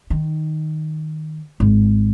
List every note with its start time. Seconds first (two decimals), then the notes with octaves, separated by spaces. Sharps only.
0.10 D#3
1.60 G#1